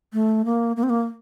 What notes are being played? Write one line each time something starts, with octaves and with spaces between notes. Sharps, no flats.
A3
A#3
A#3
C4
A#3